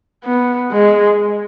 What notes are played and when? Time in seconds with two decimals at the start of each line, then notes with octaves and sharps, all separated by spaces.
0.25 B3
0.72 G#3